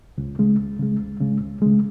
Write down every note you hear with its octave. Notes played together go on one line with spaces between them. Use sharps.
C#2
C#3 G#3
C#2
C#3 G#3
C#2
C#3 G#3
C#2
C#3 G#3